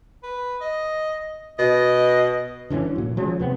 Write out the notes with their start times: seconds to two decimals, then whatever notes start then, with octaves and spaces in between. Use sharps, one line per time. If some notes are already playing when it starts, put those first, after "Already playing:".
0.23 B4
0.61 D#5
1.59 B2 D#5
2.70 D3 E3 G3 C#4
2.96 A#2 F#3
3.17 F3 F#3 G#3 C#4
3.39 D#2 C3 B3 C4